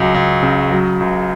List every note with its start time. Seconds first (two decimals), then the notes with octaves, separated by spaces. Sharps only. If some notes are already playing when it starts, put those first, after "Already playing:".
Already playing: C#2 F#3
0.14 C#2
0.43 C#3
0.71 F#3
1.01 C#2